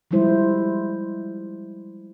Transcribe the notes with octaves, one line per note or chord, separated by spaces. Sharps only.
F3 G3 G#3 E4 C5